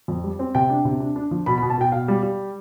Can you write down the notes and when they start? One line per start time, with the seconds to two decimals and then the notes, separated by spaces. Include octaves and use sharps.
0.08 F2
0.24 G3
0.39 C4
0.55 C3 G5
0.70 D4
0.85 C3
1.00 D4
1.16 D4
1.31 F3
1.46 B2 B5
1.58 B5
1.62 B2
1.70 A5
1.78 B2 G5
1.92 B2 F5
2.08 G3
2.23 G3